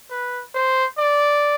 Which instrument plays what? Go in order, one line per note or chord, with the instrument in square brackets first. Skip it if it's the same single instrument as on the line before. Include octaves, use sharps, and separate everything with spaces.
[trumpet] B4
C5
D5